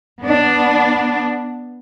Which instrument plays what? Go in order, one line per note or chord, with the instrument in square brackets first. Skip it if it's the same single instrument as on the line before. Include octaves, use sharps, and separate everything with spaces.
[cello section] B3 D4